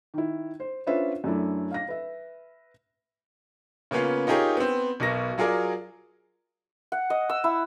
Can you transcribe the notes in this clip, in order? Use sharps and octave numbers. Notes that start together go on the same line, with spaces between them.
D#3 E4
C5
C#4 D4 F4 B4 C5 E5
F#2 A3 D4 E4
F5 A#6
B4 E5
C#3 A#3 B3 C#4 F4
D#4 F4 G4 G#4 A#4 C#5
B3 C4
B1 B2 A#4 A#6
F#3 F4 G#4 A#4 D5
F#5
D#5
E6
E4